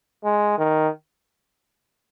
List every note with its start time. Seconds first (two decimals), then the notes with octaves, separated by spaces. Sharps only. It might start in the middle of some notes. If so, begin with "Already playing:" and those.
0.24 G#3
0.58 D#3